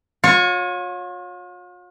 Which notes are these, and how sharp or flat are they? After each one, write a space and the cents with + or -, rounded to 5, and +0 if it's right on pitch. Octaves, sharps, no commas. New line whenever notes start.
F4 +45 C#5 +0